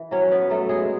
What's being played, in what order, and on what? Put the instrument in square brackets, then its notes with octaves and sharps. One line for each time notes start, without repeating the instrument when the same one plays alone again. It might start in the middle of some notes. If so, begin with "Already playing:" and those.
Already playing: [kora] E3
F#3 C#4 C#5
B3 B4
F#3 A3 A4
G#3 G#4